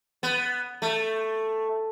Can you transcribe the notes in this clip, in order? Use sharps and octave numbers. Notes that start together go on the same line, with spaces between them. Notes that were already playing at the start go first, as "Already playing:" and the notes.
B3
A3